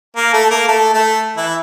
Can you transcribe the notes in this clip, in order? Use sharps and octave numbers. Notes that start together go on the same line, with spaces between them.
A#3
A3 A4
A#3 A#4
A3 A4
A3 A4
E3 E4